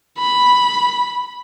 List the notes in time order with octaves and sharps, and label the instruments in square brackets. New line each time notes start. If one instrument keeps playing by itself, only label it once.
[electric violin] B5